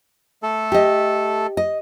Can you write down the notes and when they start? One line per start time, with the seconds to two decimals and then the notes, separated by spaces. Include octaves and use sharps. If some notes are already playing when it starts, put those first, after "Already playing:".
0.43 A3 A4
0.72 G4 D#5
1.57 D#5